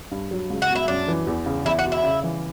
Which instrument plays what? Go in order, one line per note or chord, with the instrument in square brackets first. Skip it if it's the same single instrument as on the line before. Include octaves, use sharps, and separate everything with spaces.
[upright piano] G2
F#3
C#2
[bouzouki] F#4
[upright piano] B2
[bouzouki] E4
[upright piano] F#2 [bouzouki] D4
[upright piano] E3
E2
C#3
[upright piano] E2 [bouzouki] E4
[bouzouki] F#4
[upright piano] B2
[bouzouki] E4
[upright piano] C#3
E3